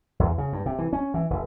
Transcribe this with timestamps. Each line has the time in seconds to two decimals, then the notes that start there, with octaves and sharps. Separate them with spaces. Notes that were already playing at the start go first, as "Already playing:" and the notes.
0.19 E2
0.38 C#3
0.53 G2
0.66 C3
0.79 E3
0.93 C#4
1.14 E3
1.30 F1